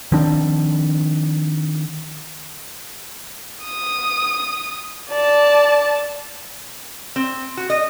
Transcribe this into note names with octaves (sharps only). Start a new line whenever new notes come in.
D#3 F3 C4 D4
D#6
D5 A5
C4
F#4
D#5